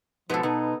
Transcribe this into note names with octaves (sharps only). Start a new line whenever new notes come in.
G#2 B2 F3 B3 A4
B2 D#4